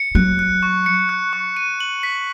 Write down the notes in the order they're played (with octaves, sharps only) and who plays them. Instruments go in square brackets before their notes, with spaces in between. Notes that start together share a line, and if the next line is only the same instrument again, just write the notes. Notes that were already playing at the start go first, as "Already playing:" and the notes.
Already playing: [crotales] C#7
[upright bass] F#3 [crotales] F#6
[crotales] F#6
C#6
C#7
F#6
C#6
D#7
F#7
B6